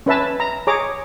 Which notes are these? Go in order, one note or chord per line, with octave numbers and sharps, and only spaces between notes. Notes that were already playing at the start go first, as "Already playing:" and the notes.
C#4 B4 E5 A5
A#5
G#4 C#5 A#5 D6